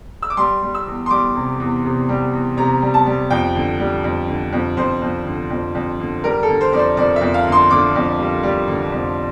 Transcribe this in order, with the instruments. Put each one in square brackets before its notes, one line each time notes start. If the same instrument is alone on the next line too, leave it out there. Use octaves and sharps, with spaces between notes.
[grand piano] E6
D6
G3 C6
G3
E6
E2
C6
G3 D6
C3
E2
C3
G3
E2
C3 A#5
G3
A5
G3
F2 G5
D3
G3
F2
D3
F2
F2 C5
F2
D3
F2
F2
D3
G3 A#4
A4
D3
C5
F2 D5
C5
F2 D5
E5
F2
F5
D3
C6
D3 D6
F2
G3
G3
D3
F2